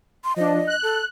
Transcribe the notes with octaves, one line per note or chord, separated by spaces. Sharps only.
C6
F3 D4 D#5
F#6
A4